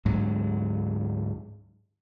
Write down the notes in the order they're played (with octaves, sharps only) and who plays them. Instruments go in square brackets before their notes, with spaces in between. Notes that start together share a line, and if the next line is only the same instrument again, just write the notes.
[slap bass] D2 G#2 F#3